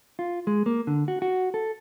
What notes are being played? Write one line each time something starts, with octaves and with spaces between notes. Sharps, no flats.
F4
G#3
A#3
D3
F#4
F#4
A4